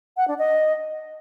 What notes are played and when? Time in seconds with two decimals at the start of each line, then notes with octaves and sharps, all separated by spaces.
0.17 F#5
0.28 D4
0.39 D#5